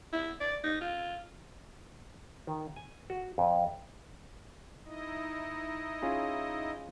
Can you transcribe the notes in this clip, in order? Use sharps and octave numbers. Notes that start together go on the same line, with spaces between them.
E4
D5
D#4
F4
D#3
G#5
F#4
F2
D#4 E4 D#5
C#4 F4 G#4